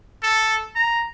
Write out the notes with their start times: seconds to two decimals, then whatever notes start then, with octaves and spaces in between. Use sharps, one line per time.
0.23 A4
0.76 A#5